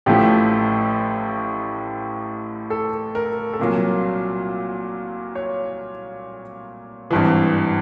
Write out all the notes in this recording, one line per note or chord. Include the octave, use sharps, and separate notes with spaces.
A1 A2 F3 A3 G4
A4
A#4
A4
C2 A#2 F#3 A#4
C#5
G#1 G2 E3